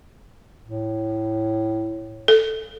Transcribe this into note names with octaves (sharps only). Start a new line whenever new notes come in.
A2
A4